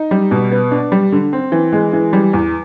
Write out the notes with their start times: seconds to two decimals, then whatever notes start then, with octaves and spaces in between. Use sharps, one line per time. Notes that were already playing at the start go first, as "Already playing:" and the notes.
Already playing: D#4
0.11 G3
0.31 B2
0.52 B3
0.71 D4
0.92 G3
1.12 D3
1.33 C4
1.52 E3
1.73 G#3
1.93 E3
2.13 G3
2.33 E2